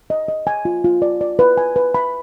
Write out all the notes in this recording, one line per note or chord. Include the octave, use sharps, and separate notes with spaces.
D#5
D#5
G#5
F4
F4
D5
D5
B4
G#5
B4
B5